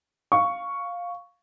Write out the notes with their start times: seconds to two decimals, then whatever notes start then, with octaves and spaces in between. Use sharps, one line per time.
0.32 F5 C#6